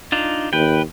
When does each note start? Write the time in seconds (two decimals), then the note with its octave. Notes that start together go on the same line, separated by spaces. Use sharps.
0.12 D4 D#4 F4
0.53 D#2 B4 G5